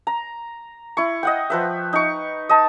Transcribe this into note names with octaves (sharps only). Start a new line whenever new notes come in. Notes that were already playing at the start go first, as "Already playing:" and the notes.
A#5
E4 C#6
D#5 F#5 G5
F3 B4 E5
D#4 C#6
D#5 A5